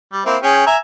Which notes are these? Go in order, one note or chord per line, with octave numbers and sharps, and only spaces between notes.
G3
A#3 C4 E4
C#4 G#4 G5
E5 G#5 A#5